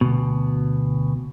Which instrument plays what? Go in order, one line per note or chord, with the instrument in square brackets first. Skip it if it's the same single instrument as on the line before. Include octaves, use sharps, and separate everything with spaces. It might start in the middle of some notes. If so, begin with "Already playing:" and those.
[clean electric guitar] D2 B2